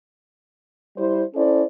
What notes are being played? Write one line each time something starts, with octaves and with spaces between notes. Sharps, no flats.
G3 E4 C5
C#4 E4 A4 C5 D5